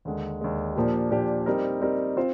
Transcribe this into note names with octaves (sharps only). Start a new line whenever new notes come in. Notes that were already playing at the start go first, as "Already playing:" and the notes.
D#2 D3 G#3
D#2 D3 G#3
A#2 F3 A#3 D4 G4
A#2 F3 A#3 D4 G4
G3 C4 D#4 A#4
G3 C4 D#4 A#4
C4 F4 C5